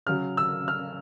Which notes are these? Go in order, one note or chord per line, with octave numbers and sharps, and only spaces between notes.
C#3 F#3 F6
E6
F6